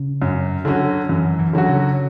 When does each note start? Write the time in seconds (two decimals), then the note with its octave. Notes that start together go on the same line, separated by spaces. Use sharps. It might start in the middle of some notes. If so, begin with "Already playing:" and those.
Already playing: C#3
0.22 F#2
0.65 D3 F#3 C#4 F#4
1.09 F#2 E3
1.39 E3
1.53 D3 F#3 C#4 F#4
1.68 C#3